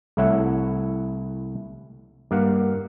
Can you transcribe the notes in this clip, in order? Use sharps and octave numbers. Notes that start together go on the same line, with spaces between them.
C2 A3 E4 C#5 F#5
G2 A#3 F5 F#5